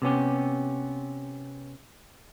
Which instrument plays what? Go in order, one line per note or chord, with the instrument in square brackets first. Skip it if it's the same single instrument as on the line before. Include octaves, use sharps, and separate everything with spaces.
[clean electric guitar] C3 B3 C#4 G4